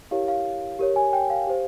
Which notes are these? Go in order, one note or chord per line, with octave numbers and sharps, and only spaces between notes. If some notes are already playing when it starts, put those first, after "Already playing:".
E4 G4 A#4 C#5 F5
F5
G4 A#4 C#5
G#5
G5
F5
G4 C5